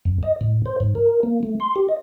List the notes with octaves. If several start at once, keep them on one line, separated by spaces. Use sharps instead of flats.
F#2
D#5
A2
C5
G#2
A#4
A#3
A3
C6
G4
D#5